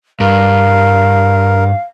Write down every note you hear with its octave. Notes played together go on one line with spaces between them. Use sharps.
G2 A#4 F5